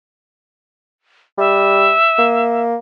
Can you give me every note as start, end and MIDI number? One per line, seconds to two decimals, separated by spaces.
1.38 1.93 55
1.38 2.64 76
2.19 2.76 58